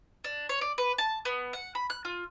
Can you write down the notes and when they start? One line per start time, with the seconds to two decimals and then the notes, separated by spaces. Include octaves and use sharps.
0.24 D4
0.49 C#5
0.61 D5
0.78 B4
0.98 A5
1.25 B3
1.53 F#5
1.75 B5
1.90 F#6
2.05 F4